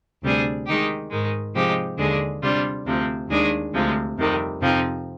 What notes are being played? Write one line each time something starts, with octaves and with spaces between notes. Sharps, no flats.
D2 C3 G3 D4 G#4
D#3 G#3 D#4 G4
G#2 D#3 G#3
C3 F3 G#3 D#4 G4
D#2 D3 G#3 D4 G#4
C3 G3 D4 F4
D2 C3 F3 C4
D#2 D#3 G#3 D4 G#4
D2 C3 F3 G#3
F2 C3 D#3 G3
F2 C3 F3 C4 D#4